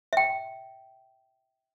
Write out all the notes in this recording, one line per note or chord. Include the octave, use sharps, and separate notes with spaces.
E5 G5